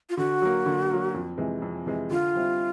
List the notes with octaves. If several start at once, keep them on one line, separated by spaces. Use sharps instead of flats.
F4
D3 F#4
F#3 A#3
D3
F#3 A#3
F2
C3 E3 G#3
F2
C3 E3 G#3
D3 F4
G3 C4 E4